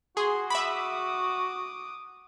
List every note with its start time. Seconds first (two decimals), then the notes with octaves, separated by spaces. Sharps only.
0.17 F#4 G#4 C6
0.50 E5 B5 D6 D#6